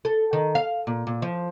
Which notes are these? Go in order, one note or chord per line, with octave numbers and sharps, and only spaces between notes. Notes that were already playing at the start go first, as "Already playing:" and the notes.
A4
D#3
F5
A#2
A#2
F3